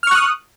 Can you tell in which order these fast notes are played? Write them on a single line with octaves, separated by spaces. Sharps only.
F6 C#6 F#6 D#6